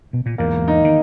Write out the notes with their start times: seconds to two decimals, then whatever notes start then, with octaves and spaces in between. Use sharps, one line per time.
0.13 B2
0.26 A#2
0.38 E2 G#2 A#3
0.68 D#4
0.84 D#3